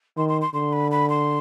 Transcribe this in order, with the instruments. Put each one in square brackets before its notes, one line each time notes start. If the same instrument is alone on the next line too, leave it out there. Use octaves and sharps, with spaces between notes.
[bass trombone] D#3 [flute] C6
[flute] C6
C6
[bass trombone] D3 [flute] C6
[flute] B5
B5
C6